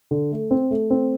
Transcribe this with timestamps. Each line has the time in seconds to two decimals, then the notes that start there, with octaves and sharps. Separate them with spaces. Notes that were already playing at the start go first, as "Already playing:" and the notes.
0.11 D3
0.32 A3
0.51 C4
0.71 A3
0.90 C4